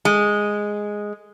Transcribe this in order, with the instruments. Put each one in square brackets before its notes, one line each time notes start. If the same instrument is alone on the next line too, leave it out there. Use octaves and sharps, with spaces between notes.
[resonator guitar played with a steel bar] G#3